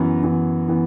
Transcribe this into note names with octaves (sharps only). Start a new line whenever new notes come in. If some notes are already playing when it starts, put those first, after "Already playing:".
Already playing: F#2 E3 B3
F#2 E3 B3
E3 B3